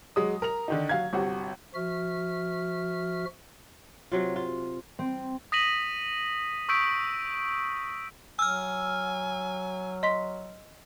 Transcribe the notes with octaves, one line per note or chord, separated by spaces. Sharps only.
F#3 G#3 D#6
A#4 A#5 F7
D3 D#3 D#4
F#3 F5 G#6
G1 C3 F#4
F3 F#4 E5 F6
C3 F#3 F4
F4
C4
D#6 A#6 B6 D#7 F#7
C#6 D#6 E6 G6 B6 D7
F#3 G#5 E6 F6
D#5 C6 B6